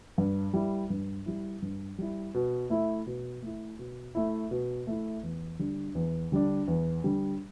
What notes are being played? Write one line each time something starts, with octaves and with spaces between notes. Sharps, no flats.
G2
G3 E4
G2
G3 E4
G2
G3 E4
B2
A3 E4
B2
A3 E4
B2
A3 E4
B2
A3 E4
E2
D3 G3 D4
E2
D3 G3 D4
E2
D3 G3 D4